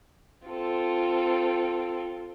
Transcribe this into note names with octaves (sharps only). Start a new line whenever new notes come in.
C4 F4 A4